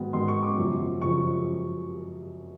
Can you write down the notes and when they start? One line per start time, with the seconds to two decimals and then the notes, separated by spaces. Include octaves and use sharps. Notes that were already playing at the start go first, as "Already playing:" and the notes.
Already playing: G#2 D#3 F#3 B3
0.13 G#2 D#3 F#3 B3 C6
0.28 C#6
0.43 D6
0.58 F#2 C#3 F3
1.02 F#2 C#3 F3 C#6